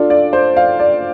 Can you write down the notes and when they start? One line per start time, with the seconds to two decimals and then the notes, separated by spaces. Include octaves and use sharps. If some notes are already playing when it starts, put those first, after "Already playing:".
Already playing: D4 F4 A4
0.10 D5
0.33 C5
0.57 F5
0.80 D5